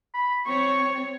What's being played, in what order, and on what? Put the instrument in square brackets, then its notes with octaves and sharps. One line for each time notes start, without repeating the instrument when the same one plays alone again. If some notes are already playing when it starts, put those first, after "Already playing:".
[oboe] B5
[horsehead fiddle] C4 C#5 [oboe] C#6